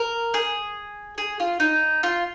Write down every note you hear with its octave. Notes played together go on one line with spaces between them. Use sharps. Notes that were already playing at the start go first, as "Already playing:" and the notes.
Already playing: A#4
G#4
G#4
F4
D#4
F4